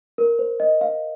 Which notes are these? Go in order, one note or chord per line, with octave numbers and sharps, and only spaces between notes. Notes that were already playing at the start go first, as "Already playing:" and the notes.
A#4
C5
D#5
F5